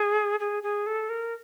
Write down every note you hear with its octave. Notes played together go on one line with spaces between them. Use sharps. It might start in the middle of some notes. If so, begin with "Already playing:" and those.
Already playing: G#4
G#4
G#4
A4
A#4